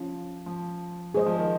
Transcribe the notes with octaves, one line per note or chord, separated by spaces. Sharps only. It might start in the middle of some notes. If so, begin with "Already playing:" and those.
Already playing: F3 C#4 F4
F3
G#3 G#4 C5 D#5
F3
D#3